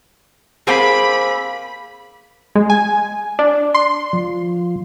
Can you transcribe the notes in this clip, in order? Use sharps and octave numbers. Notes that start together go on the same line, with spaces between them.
A#3 C4 G#4 B5
G#3
G#5
D4
C6
F3